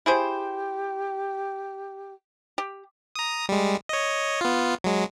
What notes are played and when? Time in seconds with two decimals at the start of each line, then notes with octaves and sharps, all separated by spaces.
0.06 E4 G4 G#4 C5
2.58 G4
3.16 A#5 D#6
3.49 G3 G#3
3.89 C#5 D#5
4.41 B3 F4
4.84 F#3 G#3